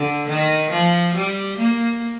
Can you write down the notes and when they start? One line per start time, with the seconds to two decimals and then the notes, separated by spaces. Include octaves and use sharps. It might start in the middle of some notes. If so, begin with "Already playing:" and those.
Already playing: D3
0.28 D#3
0.71 F3
1.15 G3
1.58 A#3